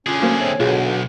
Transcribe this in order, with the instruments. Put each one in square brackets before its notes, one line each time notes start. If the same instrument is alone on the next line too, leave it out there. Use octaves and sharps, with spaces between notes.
[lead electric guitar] D3 G#4 [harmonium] C#4 [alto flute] F4
[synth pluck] F#3 A#3 C5 [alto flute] A3
[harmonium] C4 E5 [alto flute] C#5
[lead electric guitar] B1 [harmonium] B2 D3 [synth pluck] F4 G#4